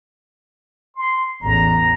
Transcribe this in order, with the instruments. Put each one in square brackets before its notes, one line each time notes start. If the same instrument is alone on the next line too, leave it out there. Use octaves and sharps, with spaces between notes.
[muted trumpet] C6
[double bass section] A1 E2 [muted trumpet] A#5